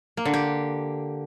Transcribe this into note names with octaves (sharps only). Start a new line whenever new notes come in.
A#3
D3
G4